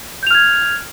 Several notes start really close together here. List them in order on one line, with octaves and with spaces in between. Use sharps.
G6 F7 F6 G#6